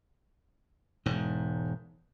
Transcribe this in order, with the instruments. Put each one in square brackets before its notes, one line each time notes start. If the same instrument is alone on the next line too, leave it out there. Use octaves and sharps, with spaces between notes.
[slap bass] E1 G#2